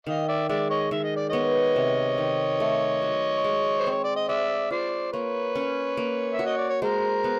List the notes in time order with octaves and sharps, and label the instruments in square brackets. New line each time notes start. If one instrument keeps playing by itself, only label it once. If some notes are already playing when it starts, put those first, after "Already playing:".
[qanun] D#3 [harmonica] D#5 F5
[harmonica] D5 E5
[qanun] G#3 [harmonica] D5 E5
[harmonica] C#5 D#5
[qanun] D#3 [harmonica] E5
[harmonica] D#5
D5
[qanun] B3 [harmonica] C#5 D#5
[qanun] C3
D#3
A3
F#3
G#3
[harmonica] C5
[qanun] C4 [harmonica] C#5
[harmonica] D5
D#5
[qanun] G#3 [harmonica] D5 E5
[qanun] F4 [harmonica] C5 D5
[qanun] A#3 [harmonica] B4 C#5
[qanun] C#4
A#3
[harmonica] E5
[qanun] F#4
[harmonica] D#5
D5
C#5
[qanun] G#3 [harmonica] A#4 C5
[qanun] B3